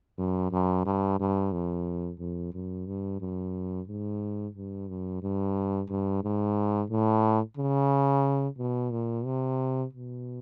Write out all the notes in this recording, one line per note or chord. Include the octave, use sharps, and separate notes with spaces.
F#2
F#2
G2
G2
F2
F2
F#2
G2
F#2
G#2
G2
F#2
G2
G2
G#2
A2
C#3
B2
A#2
C3
B2